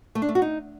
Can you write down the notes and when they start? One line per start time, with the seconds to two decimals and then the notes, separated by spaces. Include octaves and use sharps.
0.15 A3
0.22 D4
0.29 A3
0.35 F#4
0.42 D#4